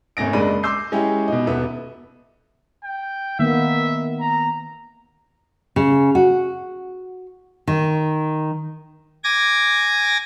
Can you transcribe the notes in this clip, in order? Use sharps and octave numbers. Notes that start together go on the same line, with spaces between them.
G#1 A3 C#4 A#6 D7
F#1 C#2 G#3 D4 B5 D#7
C6 D6 E6 G6 C7
G#3 C#4 E4 G4
B2 D#4
D#1 B2 B3 E5
G5
D#3 A#3 B3 E5
A#5
C#3
F#4
D#3
G#5 D6 G#6 A#6